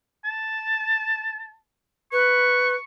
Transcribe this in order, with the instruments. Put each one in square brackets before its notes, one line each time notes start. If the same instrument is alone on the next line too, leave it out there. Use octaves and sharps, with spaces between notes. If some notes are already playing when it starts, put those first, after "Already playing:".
[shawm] A5
[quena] B4 [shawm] C#6